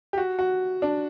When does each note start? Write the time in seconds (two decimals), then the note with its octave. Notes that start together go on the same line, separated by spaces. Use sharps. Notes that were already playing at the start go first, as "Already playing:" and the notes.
0.13 G4
0.17 F#4
0.39 F#4
0.82 D4